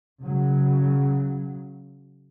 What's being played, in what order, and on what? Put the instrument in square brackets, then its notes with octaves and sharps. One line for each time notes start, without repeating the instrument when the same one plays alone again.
[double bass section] C#3 F#3